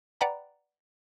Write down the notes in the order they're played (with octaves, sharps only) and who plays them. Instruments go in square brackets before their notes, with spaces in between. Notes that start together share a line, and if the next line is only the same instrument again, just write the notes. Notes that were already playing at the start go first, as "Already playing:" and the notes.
[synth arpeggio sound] B4 D5 F#5 G5 A#5 B5